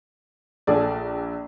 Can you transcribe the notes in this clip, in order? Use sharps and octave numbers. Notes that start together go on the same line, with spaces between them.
A#1 G#4 A4 D5